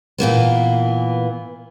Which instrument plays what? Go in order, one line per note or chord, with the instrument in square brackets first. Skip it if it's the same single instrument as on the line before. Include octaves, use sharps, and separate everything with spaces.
[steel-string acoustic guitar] A#2 E3 A#3 B3